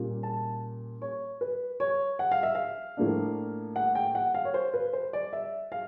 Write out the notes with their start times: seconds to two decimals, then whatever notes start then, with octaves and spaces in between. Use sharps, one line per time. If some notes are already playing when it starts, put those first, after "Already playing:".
Already playing: A#2 G3 A#3 C#4
0.23 A5
1.02 C#5
1.41 B4
1.80 C#5
2.19 F#5
2.32 F5
2.43 E5
2.55 F5
2.97 A2 F3 A#3 D4
3.76 F#5
3.95 G5
4.15 F#5
4.34 F5
4.45 C#5
4.54 C5
4.74 B4
4.93 C5
5.13 D5
5.33 E5
5.72 F5